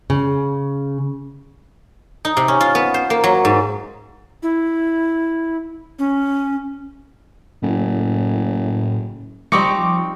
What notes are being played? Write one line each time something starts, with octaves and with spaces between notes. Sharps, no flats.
C#3
D#4
C3
C#4
F4
B3
C5
A#3
F#3
G#2
E4
C#4
F#1 A2
F3 G3 C4 D#4 C#6 D6 C#7